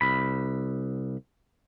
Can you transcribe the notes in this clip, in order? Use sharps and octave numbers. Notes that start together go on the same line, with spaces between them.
C2 B5